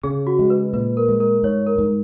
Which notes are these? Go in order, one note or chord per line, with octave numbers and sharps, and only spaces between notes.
C#3 G#4
F#4
G#3
B4
A#2 B4
A#4
G#3
A#4
G#2 C#5
A#4
G#2